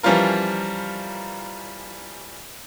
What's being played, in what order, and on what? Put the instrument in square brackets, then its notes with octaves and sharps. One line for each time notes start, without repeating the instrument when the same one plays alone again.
[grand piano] E3 F3 G3 C#4 F4 A#4